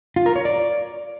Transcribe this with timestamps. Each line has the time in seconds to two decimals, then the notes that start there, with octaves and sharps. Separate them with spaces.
0.16 F4
0.26 A#4
0.36 C#5
0.45 D5